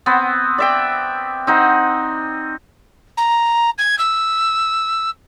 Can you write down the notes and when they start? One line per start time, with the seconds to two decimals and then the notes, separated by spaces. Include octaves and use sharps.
0.06 B3 C4
0.58 D5 E5 G5
1.47 C4 D#4 F#5
3.17 A#5
3.78 G#6
3.98 E6